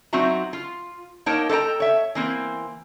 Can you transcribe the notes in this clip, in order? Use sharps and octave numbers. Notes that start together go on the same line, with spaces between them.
F#3 C4 D#4 F#4 E5 A#5
F4
A#3 D#4 A#4 C#5 G5 A5
A4 C5 D#5 G5 A#5
C#5 E5
E3 A#3 C4